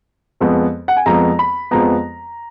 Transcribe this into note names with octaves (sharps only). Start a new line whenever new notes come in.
F2 F3 G#3 B3
F#5
G#5
F2 F3 G#3 B3 A#5
B5
F2 F3 G#3 B3 A#5